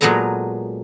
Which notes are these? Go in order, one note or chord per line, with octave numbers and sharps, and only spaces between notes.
A#2 F#3 G#3 B3 A4 A#5